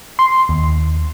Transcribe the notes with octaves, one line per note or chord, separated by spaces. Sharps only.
C6
D#2